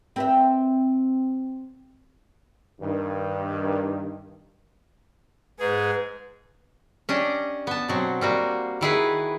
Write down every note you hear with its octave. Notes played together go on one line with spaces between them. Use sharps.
C4 B4 E5
G2 D#3
G#2 G#4 B4
C#4 D4 G4 D#5
B3 A5
B2 F#3 C4
G3 A#3 F#4
D#3 E4 G#4 B4